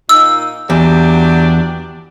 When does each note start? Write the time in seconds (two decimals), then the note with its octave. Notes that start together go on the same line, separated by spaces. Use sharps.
0.09 A#2 A#3 D#4 E6
0.70 E2 F#3 D4 G4